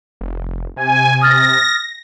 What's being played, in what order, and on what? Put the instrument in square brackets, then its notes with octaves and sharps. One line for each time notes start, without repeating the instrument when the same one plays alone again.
[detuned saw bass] F1
[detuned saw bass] C3 [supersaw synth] G#5
[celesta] D#6 F6 A6 [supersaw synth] A#6